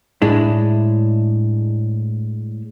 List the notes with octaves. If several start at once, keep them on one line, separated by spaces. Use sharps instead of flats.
A2 G#3 D4 E4